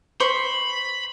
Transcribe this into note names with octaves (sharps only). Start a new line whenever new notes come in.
C5 B5 C#6